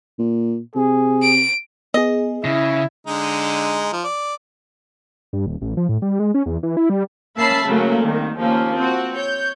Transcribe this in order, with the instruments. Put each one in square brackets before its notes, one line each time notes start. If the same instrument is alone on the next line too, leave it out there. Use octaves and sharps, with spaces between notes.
[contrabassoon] A#2
[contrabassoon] C3 [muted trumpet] G#4
[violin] D7
[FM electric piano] B3 G#4 [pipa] D#5
[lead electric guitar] C#3 [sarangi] E4 [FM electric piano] A#6
[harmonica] D3 G#3 D#4
F3
D5
[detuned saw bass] G2
D#1
A1
F3
A2
G3
G#3
C#4
E2
E3
E4
G3
[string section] A#3 C#4 E5 A5 B5 C7
C#3 F#3 A3 A#3 C#4
C2 D#3
D#2 F3 A#3 C#4
C4 F#4
C#5 G6